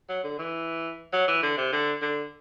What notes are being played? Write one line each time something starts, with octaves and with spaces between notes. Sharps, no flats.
F#3
D3
E3
F#3
E3
D3
C3
D3
D3